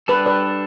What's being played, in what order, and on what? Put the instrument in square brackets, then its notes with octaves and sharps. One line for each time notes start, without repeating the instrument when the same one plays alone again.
[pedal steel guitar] G3 D4 A4 [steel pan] B4
[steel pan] B4 D5